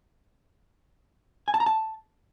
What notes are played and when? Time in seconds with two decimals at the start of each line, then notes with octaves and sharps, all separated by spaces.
1.48 G#5
1.54 A5
1.60 A#5
1.66 A5